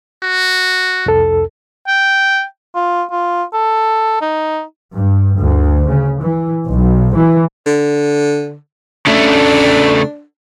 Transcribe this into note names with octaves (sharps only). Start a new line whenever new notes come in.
F#4
C2 F2 A4
G5
F4
F4
A4
D#4
G2
D2
C#3
E3
B1
E3
D3
C#3 A3 D4